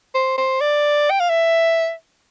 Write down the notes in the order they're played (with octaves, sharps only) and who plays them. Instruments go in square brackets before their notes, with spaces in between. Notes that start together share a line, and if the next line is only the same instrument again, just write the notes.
[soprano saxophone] C5
C5
D5
G5
F5
E5